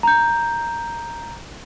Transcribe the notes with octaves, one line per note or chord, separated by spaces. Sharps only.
A#5 G6